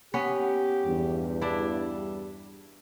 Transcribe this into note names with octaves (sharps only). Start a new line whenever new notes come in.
B3 C#4 G4 B4
E2 G2
G3 D4 E4